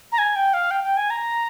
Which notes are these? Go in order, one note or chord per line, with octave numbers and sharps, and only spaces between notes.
A#5
G#5
G5
F5
G5
G5
G#5
A#5